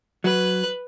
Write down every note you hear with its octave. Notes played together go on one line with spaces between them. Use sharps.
F#3 B4 F#6